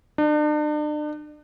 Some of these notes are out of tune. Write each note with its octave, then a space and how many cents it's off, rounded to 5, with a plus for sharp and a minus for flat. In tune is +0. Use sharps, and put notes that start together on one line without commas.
D4 +40